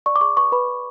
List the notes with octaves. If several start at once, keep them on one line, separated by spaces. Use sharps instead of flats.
D5 C#6
D6
G#4 C#6
B4 C#6
B4 B5
B4